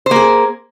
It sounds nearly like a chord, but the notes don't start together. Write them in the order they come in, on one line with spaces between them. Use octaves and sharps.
C5 A#3 G#4